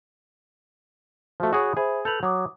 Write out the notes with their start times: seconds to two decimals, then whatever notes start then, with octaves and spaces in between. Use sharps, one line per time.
1.40 F3 A3 F#4
1.53 F#4 G#4 C#5 B5 D#6
1.77 G#4 C5 E5 B5
2.05 A4 B4 G6 F7 F#7
2.23 F#3 D6 D#6